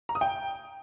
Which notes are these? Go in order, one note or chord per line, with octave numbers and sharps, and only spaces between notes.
A#5
D#6
G5